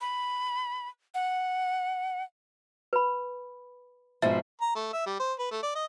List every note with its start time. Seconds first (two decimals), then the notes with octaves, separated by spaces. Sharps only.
0.01 B5
1.14 F#5
2.93 B4 B5
4.22 G#2 B2 F3 E5
4.61 A#5
4.75 A3
4.93 E5
5.06 G3
5.20 C5
5.39 B4
5.51 A3
5.63 D5
5.75 D#5